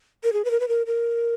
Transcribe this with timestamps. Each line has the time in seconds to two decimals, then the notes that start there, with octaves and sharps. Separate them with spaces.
0.23 A#4
0.33 G#4
0.45 B4
0.51 A#4
0.60 B4
0.68 A#4
0.87 A#4